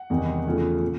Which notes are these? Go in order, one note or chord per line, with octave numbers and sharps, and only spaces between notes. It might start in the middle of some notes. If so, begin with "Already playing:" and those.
Already playing: F#5
E2 C3 D#3 G3 B3
E2 C#3 F3 A3
A#2